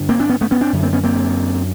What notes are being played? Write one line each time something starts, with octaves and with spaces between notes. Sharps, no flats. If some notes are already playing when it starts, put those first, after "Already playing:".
Already playing: G2 D3
A#3 C4
C4 D4
B3 C#4
A3 B3
B3 C#4
C4 D4
F#2 D3
A#3 C4
B3 C#4
A#3 C4